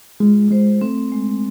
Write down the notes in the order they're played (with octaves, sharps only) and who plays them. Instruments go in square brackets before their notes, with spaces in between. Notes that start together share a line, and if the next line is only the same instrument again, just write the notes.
[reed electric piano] G#3 [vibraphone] F4
[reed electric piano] G#3 [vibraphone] C5
[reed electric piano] A3 [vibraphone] C4
[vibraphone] G#3